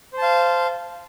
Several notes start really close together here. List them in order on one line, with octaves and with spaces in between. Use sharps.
C5 A5 F5